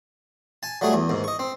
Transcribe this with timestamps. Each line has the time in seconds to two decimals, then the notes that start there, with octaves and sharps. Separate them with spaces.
0.63 G#5 A5
0.81 F#3 G3 A3 F#4 G#4
0.93 E2
1.09 D#2 G#2
1.24 D#5 C#6
1.39 C4